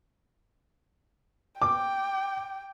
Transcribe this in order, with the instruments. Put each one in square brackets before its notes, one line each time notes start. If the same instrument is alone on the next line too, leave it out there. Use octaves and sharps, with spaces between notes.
[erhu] G5 [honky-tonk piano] D6